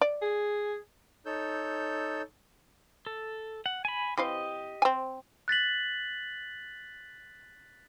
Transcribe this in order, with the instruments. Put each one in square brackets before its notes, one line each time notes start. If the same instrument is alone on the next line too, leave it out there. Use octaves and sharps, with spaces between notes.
[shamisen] D5
[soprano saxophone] G#4
[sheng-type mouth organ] D#4 A4 C#5 E6 G6
[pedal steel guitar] A4
F#5
G#5 B5
[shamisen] E3 C4 F5 [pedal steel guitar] G4 D#5
[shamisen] C4 G#5
[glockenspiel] F#6 A6 B6 F#7